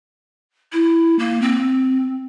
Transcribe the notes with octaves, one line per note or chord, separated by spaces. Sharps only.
E4
A#3
C4